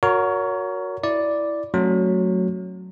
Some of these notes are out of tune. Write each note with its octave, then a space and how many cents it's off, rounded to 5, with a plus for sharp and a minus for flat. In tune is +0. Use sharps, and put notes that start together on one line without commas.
F#4 -15 A#4 +0 C#5 +25
E4 +0 D5 +0
F#3 -5 A3 +0 C#4 -35